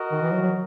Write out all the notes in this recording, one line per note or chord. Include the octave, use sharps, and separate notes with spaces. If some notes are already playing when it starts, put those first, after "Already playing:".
Already playing: F#4 A#4 D#5
D#3
E3
F#3
F#3